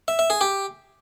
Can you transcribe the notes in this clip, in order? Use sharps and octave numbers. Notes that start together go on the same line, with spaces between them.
E5
E5
G#4
G4